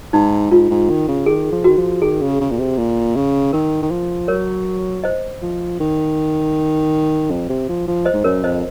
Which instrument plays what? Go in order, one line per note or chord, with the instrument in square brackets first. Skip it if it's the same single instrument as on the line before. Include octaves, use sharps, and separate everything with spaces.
[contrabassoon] G#2 [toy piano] D#4
[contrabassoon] G#2 [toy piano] F4
[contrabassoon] G#2
D#3
C#3
[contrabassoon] D#3 [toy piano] G#4
[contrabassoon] F3
[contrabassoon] D#3 [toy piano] F#4
[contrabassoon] F3
[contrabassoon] D#3 [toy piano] G#4
[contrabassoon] C#3
C#3
A#2
C3
A#2
C#3
[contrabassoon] D#3 [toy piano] A#4
[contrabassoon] D#3
F3
[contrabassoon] F#3 [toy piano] A#4 C#5
[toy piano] C5 D#5
[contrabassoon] F3
D#3
F2
C3
F3
F3
[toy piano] C5 D#5
[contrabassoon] G#2
[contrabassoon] F#2 [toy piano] A#4 C#5
[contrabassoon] F2 [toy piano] C5 D#5